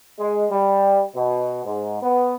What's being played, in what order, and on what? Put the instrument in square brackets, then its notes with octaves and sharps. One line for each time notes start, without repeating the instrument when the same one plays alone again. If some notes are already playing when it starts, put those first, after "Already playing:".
[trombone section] G#3
G3
B2
G#2
B3